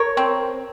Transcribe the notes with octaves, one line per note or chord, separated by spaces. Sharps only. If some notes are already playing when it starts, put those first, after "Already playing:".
Already playing: A#4 C#5
C4